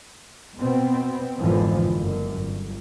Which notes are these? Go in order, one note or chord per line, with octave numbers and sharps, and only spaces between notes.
B2 B3 C4
G#1 F2 B2 D3 E3 F3
F#1 F#2
G1